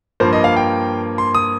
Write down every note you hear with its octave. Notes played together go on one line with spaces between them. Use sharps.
G2 F3 A#3 C5
D#5
F5
G5
C6
D#6